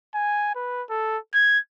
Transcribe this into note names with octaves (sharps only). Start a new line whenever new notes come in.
G#5
B4
A4
G#6